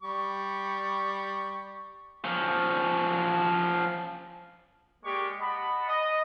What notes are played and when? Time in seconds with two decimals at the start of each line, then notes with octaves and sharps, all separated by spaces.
0.03 G3 C#6
2.24 F3 C#4
5.04 G#3 A#3 G4 D5 C#6
5.40 D#5 F#5 A5 B5
5.88 D#5